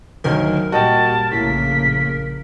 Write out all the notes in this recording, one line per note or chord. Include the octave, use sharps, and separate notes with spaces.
D2 D#3 F#3 A#4
A#2 G3 F#4 D#5 G5 A5
A#1 A2 C#3 A#3 B6